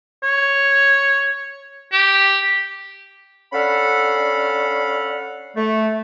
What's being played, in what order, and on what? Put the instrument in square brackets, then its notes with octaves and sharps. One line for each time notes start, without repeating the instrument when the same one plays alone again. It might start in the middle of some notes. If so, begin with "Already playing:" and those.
[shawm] C#5
G4
[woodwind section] C#4 D4 A4 F5 F#5 B5
A3